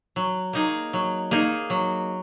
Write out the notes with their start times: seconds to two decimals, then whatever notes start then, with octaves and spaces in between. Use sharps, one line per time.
0.16 F#3
0.53 A#3 D#4 G#4
0.93 F#3
1.31 A#3 D#4 G#4
1.70 F#3